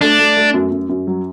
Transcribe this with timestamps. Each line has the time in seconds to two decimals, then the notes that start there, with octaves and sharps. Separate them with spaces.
0.01 A3 D4
0.19 A3
0.37 A3
0.54 F#2
0.71 F#2
0.89 F#2
1.07 F#3